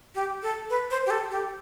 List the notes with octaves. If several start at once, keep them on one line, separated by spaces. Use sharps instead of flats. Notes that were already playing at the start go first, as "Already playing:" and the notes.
G4
A4
B4
C5
G4
A4
G4